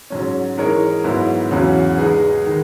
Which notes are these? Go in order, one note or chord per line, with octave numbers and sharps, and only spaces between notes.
G#2 F#3 C#4
E3 G#3 D#4 A#4 C#5
G#2 F#3 B3 E4
E2 C#3 F#3 C#4 F#4
G#3 D#4 G#4 B4
D#3 G#3